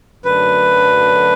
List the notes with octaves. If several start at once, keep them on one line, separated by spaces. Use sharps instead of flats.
F#2 D3 F#3 A3 D4 B4